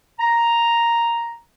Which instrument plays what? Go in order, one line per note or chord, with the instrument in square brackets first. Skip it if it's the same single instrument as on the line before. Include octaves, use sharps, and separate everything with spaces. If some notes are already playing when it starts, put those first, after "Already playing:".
[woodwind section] A#5